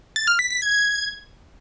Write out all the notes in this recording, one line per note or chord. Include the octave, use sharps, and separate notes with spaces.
A6
F6
B6
B6
G#6